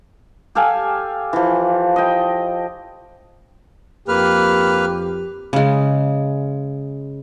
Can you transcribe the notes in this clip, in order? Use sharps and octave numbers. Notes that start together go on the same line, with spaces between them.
G4 A4 F5 G#5
E3 F3
D#5 G5
F2 A#3 G4 B4 F6
C#3 G#3